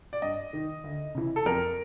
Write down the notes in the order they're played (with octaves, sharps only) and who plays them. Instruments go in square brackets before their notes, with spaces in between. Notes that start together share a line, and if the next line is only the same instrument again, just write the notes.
[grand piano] D5
G2 D#5
D#3
D2
C#3 E3
A4
F2 A#4